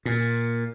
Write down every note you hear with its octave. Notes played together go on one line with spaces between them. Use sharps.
A#2